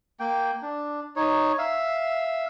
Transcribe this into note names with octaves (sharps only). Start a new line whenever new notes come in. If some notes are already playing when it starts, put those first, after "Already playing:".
A#3 G5
D4
D#4 C#5
E5 F5